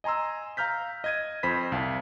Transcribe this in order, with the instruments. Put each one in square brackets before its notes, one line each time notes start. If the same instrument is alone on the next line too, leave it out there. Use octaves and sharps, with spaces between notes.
[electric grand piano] D#5 G#5 A#5 C6 E6
F5 A#5 F6 G6 B6
D#5 G#6 D#7
F2 C5 B5 B6
C2 F5 A5